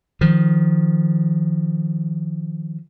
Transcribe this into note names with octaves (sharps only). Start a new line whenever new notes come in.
D#3 F3